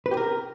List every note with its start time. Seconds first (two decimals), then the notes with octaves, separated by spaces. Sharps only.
0.06 B4
0.11 G4
0.17 A#4